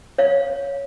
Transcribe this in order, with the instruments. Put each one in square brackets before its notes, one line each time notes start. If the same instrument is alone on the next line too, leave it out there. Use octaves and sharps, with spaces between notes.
[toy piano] C#5 F5